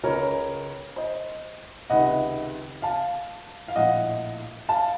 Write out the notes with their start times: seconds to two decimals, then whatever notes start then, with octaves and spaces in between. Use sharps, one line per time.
0.03 C#2 C#3 A#4 C#5
0.96 C5 D#5
1.90 C#2 C3 D#3 D#5 F#5
2.82 F5 A5
3.68 F5
3.76 A#1 A2 D#5 F#5
4.69 F5 A5